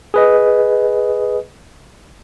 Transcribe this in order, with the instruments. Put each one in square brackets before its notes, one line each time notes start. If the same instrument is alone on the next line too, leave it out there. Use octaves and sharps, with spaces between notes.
[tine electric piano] G#4 B4 D#5